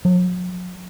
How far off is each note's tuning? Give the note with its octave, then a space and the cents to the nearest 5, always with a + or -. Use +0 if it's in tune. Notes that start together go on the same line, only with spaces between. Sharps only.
F#3 -40